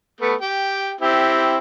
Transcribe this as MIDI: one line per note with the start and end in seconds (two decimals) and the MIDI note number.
0.21 0.35 57
0.21 0.35 59
0.41 0.92 67
0.41 0.92 79
1.01 1.58 60
1.01 1.58 64
1.01 1.58 67